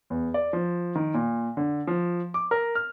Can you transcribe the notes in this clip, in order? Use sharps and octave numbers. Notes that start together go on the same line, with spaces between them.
E2
D5
F3
D#3
A#2
D3
F3
D6
A#4
F6